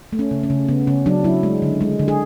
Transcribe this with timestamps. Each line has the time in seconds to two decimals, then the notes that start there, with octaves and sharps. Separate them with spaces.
0.13 A3
0.19 C#4
0.31 C#3
0.43 C#4
0.50 C#3
0.68 C#3 B3
0.87 C#3 C#4
1.06 F#3 D4
1.24 F#3 E4
1.43 G#3
1.62 D3
1.81 G#3
1.99 D3
2.08 G#4